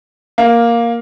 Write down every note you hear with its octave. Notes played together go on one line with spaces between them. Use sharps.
A#3